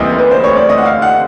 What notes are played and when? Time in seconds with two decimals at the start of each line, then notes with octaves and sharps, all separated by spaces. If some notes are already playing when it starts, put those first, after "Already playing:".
Already playing: D2 C3 E3 G3 A#3 D#5
0.18 B4
0.31 C5
0.44 C#5
0.56 D5
0.69 D#5
0.78 F#5
0.85 F5
1.02 F#5